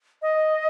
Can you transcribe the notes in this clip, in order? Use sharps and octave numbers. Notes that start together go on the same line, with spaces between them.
D#5